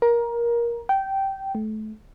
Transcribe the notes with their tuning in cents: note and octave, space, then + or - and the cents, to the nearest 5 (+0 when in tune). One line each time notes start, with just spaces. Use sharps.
A#4 +15
G5 -15
A3 -30